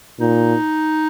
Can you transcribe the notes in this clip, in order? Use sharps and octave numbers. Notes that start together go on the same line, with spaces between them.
A#2 D#4